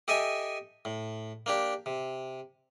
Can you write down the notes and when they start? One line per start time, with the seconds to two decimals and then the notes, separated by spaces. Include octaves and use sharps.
0.08 G4 A4 D#5 E5 G#5
0.85 A2
1.46 A#3 D4 G4
1.86 C3